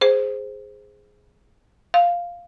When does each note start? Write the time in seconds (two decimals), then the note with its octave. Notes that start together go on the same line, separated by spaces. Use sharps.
0.01 G#4 C5
1.94 F5